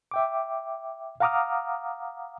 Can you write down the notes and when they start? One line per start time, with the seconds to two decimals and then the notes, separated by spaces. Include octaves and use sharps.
0.11 E5 G5 D6
1.20 F5 F#5 A#5 D6 D#6 F6